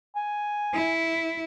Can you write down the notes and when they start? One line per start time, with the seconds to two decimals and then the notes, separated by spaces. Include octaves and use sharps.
0.16 G#5
0.74 E4